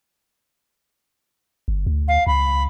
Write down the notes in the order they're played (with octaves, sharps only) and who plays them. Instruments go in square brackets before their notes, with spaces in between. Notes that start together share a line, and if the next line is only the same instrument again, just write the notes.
[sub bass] G1
D2
[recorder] F5
[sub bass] C#2 [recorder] B5